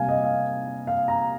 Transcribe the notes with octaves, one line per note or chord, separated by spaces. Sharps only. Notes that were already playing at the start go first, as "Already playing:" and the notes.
Already playing: C3 G3 A#3 F5 G#5
D#5
F5
F5
A#5